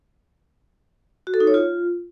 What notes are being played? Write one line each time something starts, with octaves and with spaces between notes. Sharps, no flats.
F#4
A4
D#4
C#5
F4